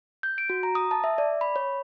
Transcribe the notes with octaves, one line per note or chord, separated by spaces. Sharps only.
G6
D7
F#4
A#5
D#6
A5
E5
D5
B5
C#5